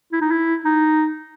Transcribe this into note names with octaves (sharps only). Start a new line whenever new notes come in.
E4
D#4
E4
D#4